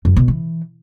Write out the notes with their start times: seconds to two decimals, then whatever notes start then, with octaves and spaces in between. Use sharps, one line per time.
0.05 F#2
0.17 B2
0.28 E3